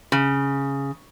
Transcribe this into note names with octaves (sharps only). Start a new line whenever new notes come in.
C#3